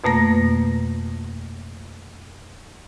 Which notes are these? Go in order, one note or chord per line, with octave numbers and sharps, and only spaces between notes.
F2 B2 A3 A#3 A#6